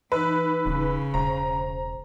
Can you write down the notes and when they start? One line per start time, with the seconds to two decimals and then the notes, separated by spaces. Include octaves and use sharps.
0.12 E3 D#4 B4 E6
0.66 D#1 C#3
1.14 E1 C5 A#5